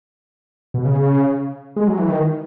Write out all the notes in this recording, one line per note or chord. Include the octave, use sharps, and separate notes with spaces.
B2
C#3
G#3
F#3
E3
D#3